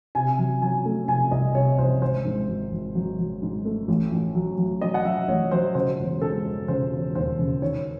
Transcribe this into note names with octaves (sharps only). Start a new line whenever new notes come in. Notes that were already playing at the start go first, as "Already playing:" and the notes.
C3 G#5
F#3
F#3 G#5
A3
C3 G#5
C2 D#5
C3 C#5
C2 C5
G#1 C5
G#2
G#1
G#1
F#3
F#3
G#2
A3
A1
A1
F#3
F#3
F#3 D#5
F#5
F#3 E5
A1 C#5
F#3 C5
C#3 C5
E1
G#3 A4
E1
C#3 C5
E1
D#2 C5
C#3
D#3 C#5